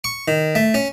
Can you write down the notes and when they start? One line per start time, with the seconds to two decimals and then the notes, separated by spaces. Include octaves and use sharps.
0.04 C#6
0.28 D#3
0.55 A3
0.74 C#4